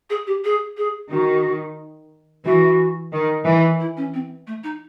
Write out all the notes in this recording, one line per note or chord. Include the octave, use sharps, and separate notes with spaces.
G#4
G4
G#4
G#4
D#3 F#4
E3 F#4
D#3
E3
E4
C#4
C4
A3
D#4